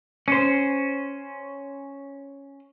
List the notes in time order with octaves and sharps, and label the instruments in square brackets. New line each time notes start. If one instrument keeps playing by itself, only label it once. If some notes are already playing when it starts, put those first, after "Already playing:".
[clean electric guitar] C#4 C5